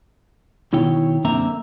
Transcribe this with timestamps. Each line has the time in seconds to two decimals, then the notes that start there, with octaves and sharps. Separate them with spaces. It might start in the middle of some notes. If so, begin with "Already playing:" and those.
0.73 B2 D#3 E4 C#5 G5
1.24 F#2 D3 A#3 C4 E5 A#5